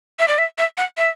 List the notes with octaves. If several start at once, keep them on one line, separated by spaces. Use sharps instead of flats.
E5
D5
E5
E5
F#5
E5